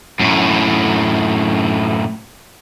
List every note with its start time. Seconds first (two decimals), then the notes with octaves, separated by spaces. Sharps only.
0.19 F#2 A2